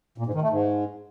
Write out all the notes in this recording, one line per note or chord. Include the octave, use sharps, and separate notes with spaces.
A#2
G#2
D#3
A3
G#2